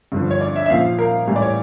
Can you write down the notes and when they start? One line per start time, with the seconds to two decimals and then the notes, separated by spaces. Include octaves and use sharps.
0.12 G2 D3 F3
0.31 C#5
0.41 D5
0.56 E5
0.66 E5
0.70 A#2 F3 F5
0.99 A#4
1.27 A2 E3 G3
1.36 D5
1.42 C#5